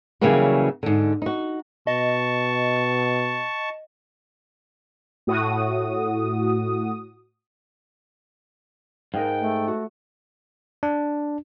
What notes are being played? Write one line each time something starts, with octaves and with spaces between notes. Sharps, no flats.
C#3 E3 F#3 G3 A#3 F#4
G#2 D3
D#4 F#4
B2 D#5 A5 C#6
A2 F#4 D#6
G#2 A#4 D#5 F5 G5
A3
F#4
D4